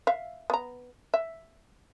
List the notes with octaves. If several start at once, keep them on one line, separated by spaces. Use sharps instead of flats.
E5 F5
B3 A#5
E5